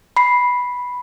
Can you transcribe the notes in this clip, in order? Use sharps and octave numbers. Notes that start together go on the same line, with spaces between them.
B5 C7